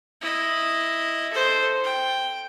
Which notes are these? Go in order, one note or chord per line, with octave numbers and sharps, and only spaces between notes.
E4 D#5
A4 C5
G5